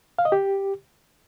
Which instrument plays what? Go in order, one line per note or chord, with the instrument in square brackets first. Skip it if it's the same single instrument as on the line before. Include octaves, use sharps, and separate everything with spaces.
[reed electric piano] F5
D#5
G4